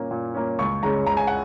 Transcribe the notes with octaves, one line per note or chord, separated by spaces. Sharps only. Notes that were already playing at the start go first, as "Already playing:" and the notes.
Already playing: A#2 A#3 C#4
A#2
A#3 C#4
C#2 C#6
C#3 G#3 C#4 A#5
C#2 A#5
G#5
F#5